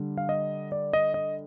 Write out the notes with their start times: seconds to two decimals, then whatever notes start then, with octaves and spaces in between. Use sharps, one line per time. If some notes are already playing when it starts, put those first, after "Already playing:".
Already playing: D3 G3
0.18 F5
0.29 D#5
0.72 D5
0.93 D#5
1.14 D#5